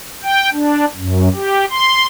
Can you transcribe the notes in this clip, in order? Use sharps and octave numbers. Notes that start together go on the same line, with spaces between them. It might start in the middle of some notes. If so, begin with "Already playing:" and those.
G5
D4
F#2
G4
C6